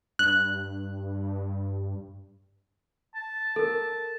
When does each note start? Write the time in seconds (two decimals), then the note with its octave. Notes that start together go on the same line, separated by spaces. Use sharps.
0.19 G2 F#6
3.15 A5
3.56 A4 A#4